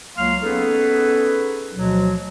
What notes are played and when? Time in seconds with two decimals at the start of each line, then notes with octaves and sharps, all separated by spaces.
0.18 C#2 F#3 A#3 F5 C6 F6
0.43 B3 C#4 D#4 G#4 A4 B4
1.74 D2 B2 F3 F#3